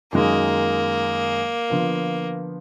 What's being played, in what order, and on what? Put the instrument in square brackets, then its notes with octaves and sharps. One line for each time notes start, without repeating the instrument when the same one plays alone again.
[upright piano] F#2 D#3 G#3 D#4 G#4 [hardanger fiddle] A#3
[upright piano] D3 F3 B3